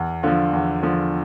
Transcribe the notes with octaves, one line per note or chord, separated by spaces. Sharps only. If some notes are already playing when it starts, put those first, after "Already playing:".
Already playing: E2
D3 F3 F4
E2
D3 F3